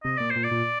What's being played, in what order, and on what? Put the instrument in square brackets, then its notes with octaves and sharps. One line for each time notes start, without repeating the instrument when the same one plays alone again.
[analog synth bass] C3 [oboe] D#5
[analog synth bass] A#2 [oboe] D5
[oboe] C5
[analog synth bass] A#2
[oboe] D5
[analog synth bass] A#2